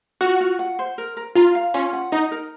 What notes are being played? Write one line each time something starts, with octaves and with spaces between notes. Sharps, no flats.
F4 F#4
F4
F#5
C5
A#4
A#4
F4 A#5
F5
C#4 F4
F#5
D#4 D#5
A#4